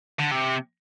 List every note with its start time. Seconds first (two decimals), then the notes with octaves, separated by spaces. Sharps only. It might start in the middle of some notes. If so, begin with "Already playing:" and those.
0.19 D3
0.32 C3